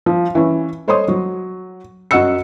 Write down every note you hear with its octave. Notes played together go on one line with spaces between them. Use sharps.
F3
E3 C#4
A4 C5 C#5 D#5 C6 D#6
F#3
F#2 F#4 D#5 F#5 E6 C#7